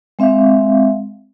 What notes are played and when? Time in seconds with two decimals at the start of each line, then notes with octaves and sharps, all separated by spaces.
0.19 G#3 C4 E5 F5